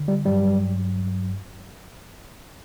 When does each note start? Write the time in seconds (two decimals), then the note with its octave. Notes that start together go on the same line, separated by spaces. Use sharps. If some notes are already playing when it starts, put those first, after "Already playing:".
Already playing: D3
0.08 G3
0.25 G2 F#3 G3